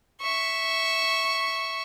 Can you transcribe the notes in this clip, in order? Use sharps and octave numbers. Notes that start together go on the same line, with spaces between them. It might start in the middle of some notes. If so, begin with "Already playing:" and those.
E5 C#6